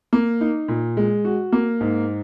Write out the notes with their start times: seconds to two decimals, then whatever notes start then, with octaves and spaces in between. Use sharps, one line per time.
0.13 A#3
0.41 D#4
0.68 A#2
0.97 G#3
1.25 F#4
1.52 A#3
1.81 G#2